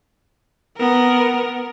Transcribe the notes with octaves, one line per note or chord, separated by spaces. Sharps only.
B3 A#4